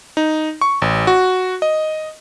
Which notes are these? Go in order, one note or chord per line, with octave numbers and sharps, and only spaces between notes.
D#4
C#6
A1
F#4
D#5